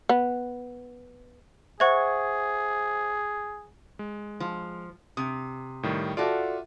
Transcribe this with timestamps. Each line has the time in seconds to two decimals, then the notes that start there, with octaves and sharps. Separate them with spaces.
0.09 B3
1.80 G#4 C5 E5 F#5 C#6 G#6
3.99 G#3
4.40 F3
5.17 C3 D#6
5.83 A2 D#3 G3
6.17 F4 F#4 A4 D5 E5